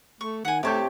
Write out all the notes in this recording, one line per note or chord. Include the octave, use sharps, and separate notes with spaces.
A3 C#6
D#3 F#5 G#5
C3 A3 G4 C#5 G5 A5 D6